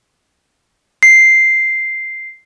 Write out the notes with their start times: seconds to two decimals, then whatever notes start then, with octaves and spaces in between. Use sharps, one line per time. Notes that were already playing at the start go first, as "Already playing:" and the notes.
1.03 C7